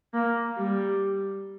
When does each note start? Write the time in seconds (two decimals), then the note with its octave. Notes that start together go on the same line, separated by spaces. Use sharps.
0.14 A#3
0.57 G3